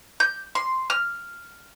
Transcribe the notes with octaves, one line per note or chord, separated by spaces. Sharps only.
G6
C6
F6